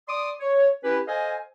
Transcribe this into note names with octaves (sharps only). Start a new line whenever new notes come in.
D5 C6 D6 D#6
C#5
C#4 E4 G4 B4
A4 C5 D#5 F5 G#5